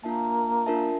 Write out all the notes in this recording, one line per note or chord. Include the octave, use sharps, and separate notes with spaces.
A#3 D4 F4 A#4 E5 A5
D4 F4 A#4 E5 A5